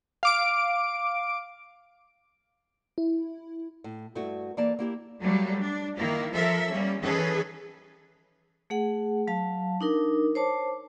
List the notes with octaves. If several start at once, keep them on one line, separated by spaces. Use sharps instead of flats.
F5 D6 D7
E4
A2
G2 A3 E4 F#4
E3 A#3 D5 A5
A#3 E4 G4
F#3 G3 A3 A#3
D4
D#3 A#3 E4
F3 A4 A#4 E5
G3 A#3 C#4
D#3 E3 C#4 G#4 A4 B4
A3 G#4 F#5
F#3 F5 A5
D4 D#4 A#4
C5 C#5 A5 D6